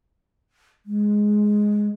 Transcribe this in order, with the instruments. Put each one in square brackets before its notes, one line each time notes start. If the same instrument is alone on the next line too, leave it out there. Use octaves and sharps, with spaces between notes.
[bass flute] G#3